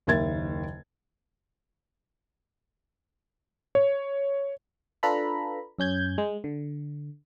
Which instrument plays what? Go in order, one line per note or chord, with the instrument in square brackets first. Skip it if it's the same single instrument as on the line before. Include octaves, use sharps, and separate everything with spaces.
[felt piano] F#1 D#2 A#4 E5 G#6 A6
[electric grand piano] C#5
[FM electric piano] D4 F4 A4 B4 A#5 B5
F#2 C#4 G6 G#6
G#3
D3